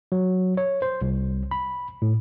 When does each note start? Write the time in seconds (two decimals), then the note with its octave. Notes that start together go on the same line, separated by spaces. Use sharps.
0.12 F#3
0.57 C#5
0.82 C5
1.02 C2
1.51 B5
2.02 A2